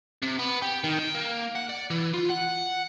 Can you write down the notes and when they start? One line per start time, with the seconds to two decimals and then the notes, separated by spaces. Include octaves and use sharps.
0.22 C3
0.39 B3
0.62 G4
0.84 D#3
0.99 G5
1.15 A#3
1.56 F#5
1.70 D5
1.90 E3
2.14 F4
2.30 F#5